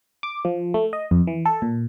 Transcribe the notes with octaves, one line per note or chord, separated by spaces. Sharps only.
D6
F3
A3
D#5
F2
E3
A4
A#2